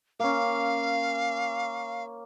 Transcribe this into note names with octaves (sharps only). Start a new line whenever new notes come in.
A#3 C#4 F5